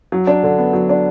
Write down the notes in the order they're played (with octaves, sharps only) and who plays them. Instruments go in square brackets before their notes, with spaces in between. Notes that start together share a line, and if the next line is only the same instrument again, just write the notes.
[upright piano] F#3
D4
D3
B3
F#3
D4